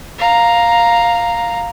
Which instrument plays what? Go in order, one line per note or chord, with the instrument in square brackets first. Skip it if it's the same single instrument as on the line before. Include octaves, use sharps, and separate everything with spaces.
[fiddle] F5 A#5